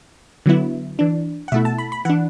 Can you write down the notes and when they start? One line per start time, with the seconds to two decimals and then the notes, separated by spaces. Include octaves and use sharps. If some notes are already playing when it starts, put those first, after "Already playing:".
0.46 D3 F#3 B3 E4
0.99 E3 D4
1.48 F#5
1.52 B2 A3 E4 E5
1.65 A5
1.78 B5
1.92 B5
2.05 E3 D4 F#5